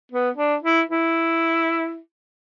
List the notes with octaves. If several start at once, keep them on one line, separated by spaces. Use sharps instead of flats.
B3
D4
E4
E4